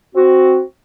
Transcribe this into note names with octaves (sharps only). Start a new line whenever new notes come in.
C4 F#4